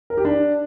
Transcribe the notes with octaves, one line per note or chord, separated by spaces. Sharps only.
A#4
G4
D4